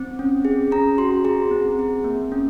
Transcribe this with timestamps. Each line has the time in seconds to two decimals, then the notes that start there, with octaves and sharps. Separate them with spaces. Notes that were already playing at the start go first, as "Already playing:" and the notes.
Already playing: C4
0.19 C#4
0.45 G#4
0.72 C#4 A#5
0.98 F#4 C6
1.24 G#4 A#5
1.51 C4
1.79 G#4
2.04 A#3
2.32 C#4